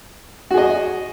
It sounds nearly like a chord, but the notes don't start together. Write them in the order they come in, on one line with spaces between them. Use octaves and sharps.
F#4 G#4 D#5